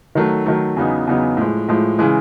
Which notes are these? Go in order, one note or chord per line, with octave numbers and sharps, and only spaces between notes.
D#3 F#3 A3
D#3 F#3 A3
E2 C#3 F#3 B3 D#4
E2 C#3 F#3 B3 D#4
A2 F3 G#3
A2 F3 G#3
C#3 E3 G#3